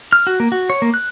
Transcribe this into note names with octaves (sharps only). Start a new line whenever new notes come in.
F6
F#4
A#3
F#4
C#5
A#3
F#6